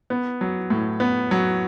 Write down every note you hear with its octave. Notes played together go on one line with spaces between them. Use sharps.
B3
F#3
A2
B3
F#3